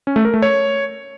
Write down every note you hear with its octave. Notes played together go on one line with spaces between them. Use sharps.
C#4
A3
A#4
A3
C#5